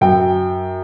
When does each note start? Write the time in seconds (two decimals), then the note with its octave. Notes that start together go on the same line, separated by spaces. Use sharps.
0.01 F#2 G5